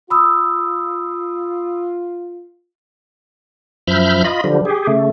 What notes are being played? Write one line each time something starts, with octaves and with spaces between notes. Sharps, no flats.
F4 B5 D#6 E6
F#2 F3 E5 B5 F6 G6
F4 D#5 B5
D3 F3 G3
G4 G#4
C#3 A3